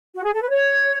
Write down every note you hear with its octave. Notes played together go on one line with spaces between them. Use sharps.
F#4
G#4
A4
B4
C#5